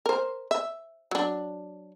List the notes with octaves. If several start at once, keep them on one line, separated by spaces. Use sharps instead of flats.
A#4 C5
E5
F#3 D4